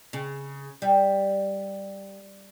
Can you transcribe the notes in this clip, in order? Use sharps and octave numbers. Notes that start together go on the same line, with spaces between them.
C#3
G3